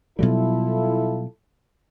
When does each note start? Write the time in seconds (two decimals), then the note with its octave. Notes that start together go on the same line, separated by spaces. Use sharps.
0.19 B2 F#3 G3 E4 F4 A4